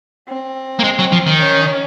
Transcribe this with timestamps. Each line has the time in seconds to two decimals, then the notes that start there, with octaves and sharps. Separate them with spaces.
0.29 C4
0.79 A#3
0.84 G#3
0.99 F#3
1.12 F3
1.27 D#3
1.40 C#4